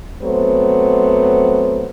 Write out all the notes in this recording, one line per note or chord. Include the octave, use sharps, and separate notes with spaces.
F#3 A3 B3 C4 C5